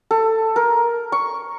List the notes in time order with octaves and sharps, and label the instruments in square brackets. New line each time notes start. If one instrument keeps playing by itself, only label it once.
[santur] A4
A#4
C#6